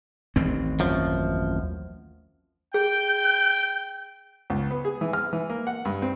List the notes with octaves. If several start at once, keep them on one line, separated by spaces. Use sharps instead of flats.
A1 D#2 C4
F#2 F3
G#4 G5 G6
C#2
B3
G#4
E3
F6
E3
A#3
F#5
G2
C4